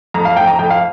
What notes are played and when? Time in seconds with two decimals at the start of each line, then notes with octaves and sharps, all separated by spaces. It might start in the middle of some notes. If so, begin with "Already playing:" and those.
0.14 F2 A#5
0.25 F5
0.37 F2 G5
0.48 A#5
0.59 F2 G5
0.70 F5